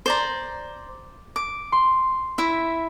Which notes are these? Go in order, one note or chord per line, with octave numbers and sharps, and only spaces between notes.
C5 D5 A#5
D6
C6
E4 E5